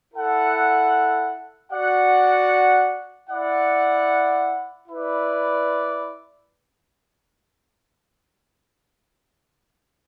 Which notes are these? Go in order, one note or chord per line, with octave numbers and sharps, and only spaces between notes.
E4 A4 F#5
F#4 D5 F#5
E4 D5 F#5
E4 B4 D5